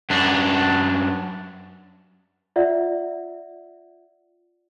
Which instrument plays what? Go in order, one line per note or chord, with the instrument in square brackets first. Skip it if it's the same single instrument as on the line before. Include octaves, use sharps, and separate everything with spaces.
[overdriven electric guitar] F#2 D4
[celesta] F4 D5 E5 F#5